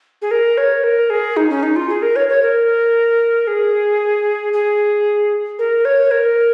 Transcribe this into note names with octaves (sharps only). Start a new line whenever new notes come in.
G#4
A#4
C#5
A#4
G#4
D#4
C#4
D#4
F4
G#4
A#4
C#5
C#5
A#4
G#4
G#4
A#4
C#5
A#4